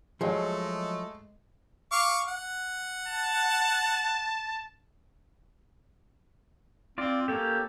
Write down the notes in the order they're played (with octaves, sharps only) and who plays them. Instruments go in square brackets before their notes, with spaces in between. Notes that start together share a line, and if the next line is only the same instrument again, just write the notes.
[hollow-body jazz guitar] F3 F#3 [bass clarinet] G#3 [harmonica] A3 [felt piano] G#4 D#5
[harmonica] F5 C#6 D6
F#5
[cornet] A5
[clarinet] C4 [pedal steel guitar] F4 D5
[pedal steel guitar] A#3 C#4 G4 [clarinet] A4